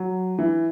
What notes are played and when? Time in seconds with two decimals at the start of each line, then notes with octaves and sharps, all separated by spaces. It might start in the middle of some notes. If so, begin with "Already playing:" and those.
Already playing: F#3
0.39 E3